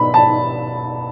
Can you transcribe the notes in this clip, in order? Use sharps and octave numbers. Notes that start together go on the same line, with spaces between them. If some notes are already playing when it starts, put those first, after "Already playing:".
Already playing: B2 B5
A5